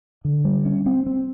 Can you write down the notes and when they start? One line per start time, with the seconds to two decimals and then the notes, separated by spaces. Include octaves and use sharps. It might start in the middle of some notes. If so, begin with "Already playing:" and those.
0.25 D3
0.45 G3
0.65 C#4
0.86 C4
1.06 C4